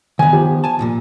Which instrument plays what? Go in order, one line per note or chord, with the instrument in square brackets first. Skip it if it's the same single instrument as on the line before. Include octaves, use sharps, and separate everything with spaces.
[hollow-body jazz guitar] D#3 B3 [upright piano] G#5
[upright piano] F3 G4
[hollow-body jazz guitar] G#5 A5
D#2 A#2